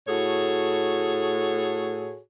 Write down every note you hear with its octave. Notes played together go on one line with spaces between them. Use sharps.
A2 F#4 G#4 A4 C#5